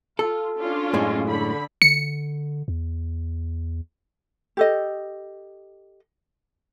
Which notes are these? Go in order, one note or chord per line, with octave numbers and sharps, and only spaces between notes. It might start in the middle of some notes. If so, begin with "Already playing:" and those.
F4 A4
C#4 D4 F4
F#2 A2 G#3
D3 B5
D3 C#7
E2
G4 A4 D#5